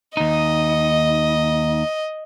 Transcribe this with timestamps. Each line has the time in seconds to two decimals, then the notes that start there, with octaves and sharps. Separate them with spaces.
0.17 D#2 D#4 D#5